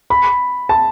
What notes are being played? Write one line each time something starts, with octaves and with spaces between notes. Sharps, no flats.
B5
A5